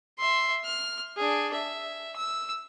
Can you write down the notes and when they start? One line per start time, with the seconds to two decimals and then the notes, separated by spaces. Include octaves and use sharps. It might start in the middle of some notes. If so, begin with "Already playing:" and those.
0.19 E5 C6
0.65 F6
1.17 D4 G#4
1.54 E5
2.16 E6